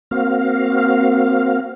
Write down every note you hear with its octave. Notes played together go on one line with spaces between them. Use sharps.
A#3 C4 F#4 F5